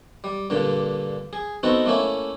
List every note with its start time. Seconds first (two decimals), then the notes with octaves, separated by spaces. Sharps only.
0.24 G3
0.50 G2 A#2 D3
1.33 G#4
1.63 B3 C4 D#4 F#4 A4
1.86 A3 A#3 C#4 E4